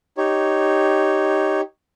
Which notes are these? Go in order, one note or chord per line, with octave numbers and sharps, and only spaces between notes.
D#4 G4 C#5